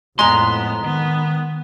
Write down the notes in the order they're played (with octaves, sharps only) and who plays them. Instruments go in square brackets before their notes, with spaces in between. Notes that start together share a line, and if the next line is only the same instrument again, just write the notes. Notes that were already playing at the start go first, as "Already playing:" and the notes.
[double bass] F2 A2 [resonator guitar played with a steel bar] G#3 A#5 [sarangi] B3 [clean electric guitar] C6
[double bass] D#3 [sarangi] B3